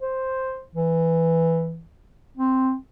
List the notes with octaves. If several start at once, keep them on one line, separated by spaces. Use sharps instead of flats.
C5
E3
C4